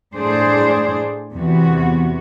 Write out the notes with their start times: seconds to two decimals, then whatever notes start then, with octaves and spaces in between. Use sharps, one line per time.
0.15 A2 D4 G#4 C5
1.34 E2 C3 E3 B3 F#4